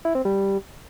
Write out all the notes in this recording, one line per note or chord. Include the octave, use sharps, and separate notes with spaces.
E4
C4
G3